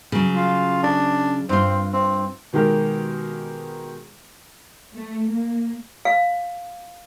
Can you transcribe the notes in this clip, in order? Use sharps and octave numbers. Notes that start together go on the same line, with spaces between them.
C#3 F#3
F4
D4
G2 C4 F4
C4
B2 D#3 G#3 G4 A#4
A3
A#3
F5